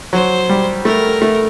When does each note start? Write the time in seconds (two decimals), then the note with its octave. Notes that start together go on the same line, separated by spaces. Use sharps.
0.13 F#3 C5
0.49 G3
0.85 A3 A#4
1.22 A3